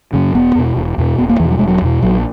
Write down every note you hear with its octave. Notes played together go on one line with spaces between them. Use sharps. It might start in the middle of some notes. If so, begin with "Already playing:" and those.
F#2 C#3
E1 B3
E2 B2
E1
E2 B2
E1 B3
A#3
E2 B2 E3
F#3
E1 G#3
F#3
E2 B2
A#1 F#3